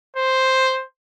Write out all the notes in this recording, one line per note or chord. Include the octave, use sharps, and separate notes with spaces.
C5